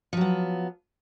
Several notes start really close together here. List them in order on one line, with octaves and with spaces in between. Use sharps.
F3 F#3 B3